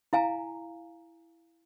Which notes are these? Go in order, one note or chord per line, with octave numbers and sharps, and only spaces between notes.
E4 F5 G#5 A#5